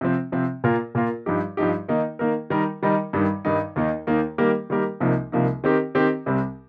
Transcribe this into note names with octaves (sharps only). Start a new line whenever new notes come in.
C3 F3 C4
C3 F3 C4
A#2 A#3 F4 A#4
A#2 A#3 F4 A#4
G2 F3 D#4 G4
G2 F3 D#4 G4
D#3 A#3 D#4 A#4
D#3 A#3 D#4 A#4
D#3 G3 D#4 A#4
D#3 G3 D#4 A#4
G2 D#3 G3 D#4
G2 D#3 G3 D#4
D#2 D#3 A#3 D#4
D#2 D#3 A#3 D#4
D#3 G3 A#3 G4 A#4
D#3 G3 A#3 G4 A#4
C2 C3 F3 A#3 D#4
C2 C3 F3 A#3 D#4
D#3 C4 G4 A#4
D#3 C4 G4 A#4
C2 C3 G3 C4